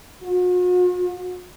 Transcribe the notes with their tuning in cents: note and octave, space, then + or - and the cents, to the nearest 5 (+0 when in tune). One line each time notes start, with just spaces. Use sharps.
F#4 -45